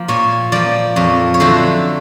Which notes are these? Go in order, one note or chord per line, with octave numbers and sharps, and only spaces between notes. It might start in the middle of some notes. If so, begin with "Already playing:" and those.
Already playing: F3 A#3
A#2 C#5
F3 A#3 D5
F2 C#5
C#5
D3 F#3 A3 C5